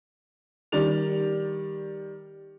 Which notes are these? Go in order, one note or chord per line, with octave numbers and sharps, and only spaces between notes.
D#3 G3 D5 F7